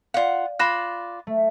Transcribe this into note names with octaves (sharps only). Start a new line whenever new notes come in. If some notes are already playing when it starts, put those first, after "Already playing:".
F4 D5 F5 F#5
F4 D5 B5 F#6 A#6 E7
A3